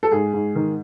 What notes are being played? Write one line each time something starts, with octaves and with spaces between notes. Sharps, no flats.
A4
G#2 G#4
G#2
D#3